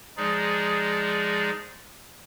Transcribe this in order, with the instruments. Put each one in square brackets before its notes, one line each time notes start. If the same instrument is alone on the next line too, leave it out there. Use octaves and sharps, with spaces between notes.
[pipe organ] F3 G#3 D#4 G#4 D5